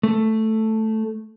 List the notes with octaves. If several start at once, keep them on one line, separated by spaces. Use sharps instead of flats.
A3